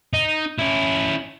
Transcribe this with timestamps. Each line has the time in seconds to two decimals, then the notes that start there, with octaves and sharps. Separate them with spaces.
0.13 D#4
0.59 C#4 E4